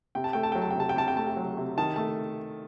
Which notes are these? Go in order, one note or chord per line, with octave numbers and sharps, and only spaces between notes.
C3 G5
A5
A3 G5
A5
F#3 G5
A5
G5
C3 A5
G5
C3 A5
G5
A3 A5
G5
F#3
C3
D#3 A5
A3 A5